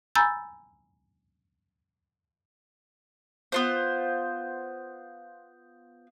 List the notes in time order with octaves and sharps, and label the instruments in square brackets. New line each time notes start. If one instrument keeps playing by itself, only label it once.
[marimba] G#5 A#5 B5 E6 G6 A6
[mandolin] B3 F4 C5